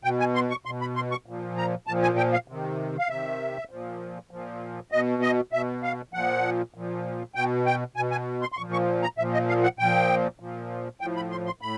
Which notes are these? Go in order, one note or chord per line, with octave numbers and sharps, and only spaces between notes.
B2 G5
G#5
C6
C#6
B2 C6
B5
C6
C#6
A#2 F3
A#5
A#2 F3 A5
G#5
G5
F5
C3 D#3
F5
C3 D#3 E5
A#2 F3
A#2 F3
B2 D#5
D#5
B2 E5
F5
A#2 F3 F#5
A#2 F3
B2 G5
G5
B2 G#5
G#5
C6
C6
A#2 F3 C#6
C#6
A#5
A#2 F3 E5
D#5
F5
F#5
A#2 F3 G5
A#2 F3
A2 F3 G5
B5
C6
C6
A2 B5